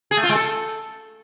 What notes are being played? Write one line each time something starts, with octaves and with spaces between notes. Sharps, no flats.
G#4
A3
F4
G#3
A4